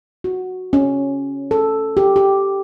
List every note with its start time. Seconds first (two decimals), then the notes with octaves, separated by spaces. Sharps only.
0.24 F#4
0.73 C#4
1.51 A4
1.97 G4
2.16 G4